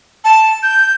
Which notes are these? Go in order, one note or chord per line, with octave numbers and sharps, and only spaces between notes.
A5
G6